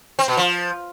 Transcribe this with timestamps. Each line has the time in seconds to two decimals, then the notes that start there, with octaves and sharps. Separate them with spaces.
0.19 C4
0.28 B2
0.37 F3